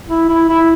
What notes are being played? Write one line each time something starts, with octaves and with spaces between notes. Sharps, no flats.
E4
E4
E4